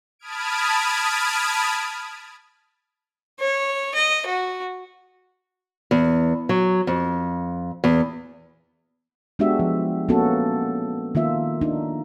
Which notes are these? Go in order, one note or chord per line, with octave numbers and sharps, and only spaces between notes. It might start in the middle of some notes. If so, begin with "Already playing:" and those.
A5 B5 D#6 F6 G#6 D7
C#5
D#5
F#4
E2
F#3
F2
E2
G#3 B3 D4 F#4 G4 E5
F3
A#3 B3 C#4 F#4 A4
D#3 A#3 F4 E5
D4 D#4